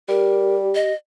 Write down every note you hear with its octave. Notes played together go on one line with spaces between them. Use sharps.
G3 G4 A#4
D#5